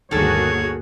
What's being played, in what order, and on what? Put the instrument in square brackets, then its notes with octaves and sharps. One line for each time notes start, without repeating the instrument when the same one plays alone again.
[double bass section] G1 D2 A#3 [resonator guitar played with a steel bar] D#3 A4 [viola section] F#4 G#4 [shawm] C#5